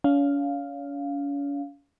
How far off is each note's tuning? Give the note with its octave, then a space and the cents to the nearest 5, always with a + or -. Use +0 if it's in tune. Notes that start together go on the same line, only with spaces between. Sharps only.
C#4 +40 F5 +0